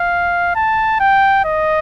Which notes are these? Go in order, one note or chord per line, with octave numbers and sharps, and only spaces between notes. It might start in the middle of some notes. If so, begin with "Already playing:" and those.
Already playing: F5
A5
G5
D#5